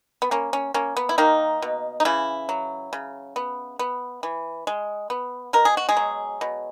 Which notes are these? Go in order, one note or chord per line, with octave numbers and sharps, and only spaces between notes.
B3
A#3 C#4
C#4
A#3 C#4
B3
E4
D#3 A#3 D#4
B2
D#4
C#3 E3 E4
F#3
C#3
B3
B3
E3
G#3
B3
B2 A#4
G#4
F#4
G#3 G#4
F#3
B2